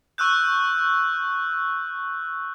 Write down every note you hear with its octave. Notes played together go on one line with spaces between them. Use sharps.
C#6 E6 F#6 G6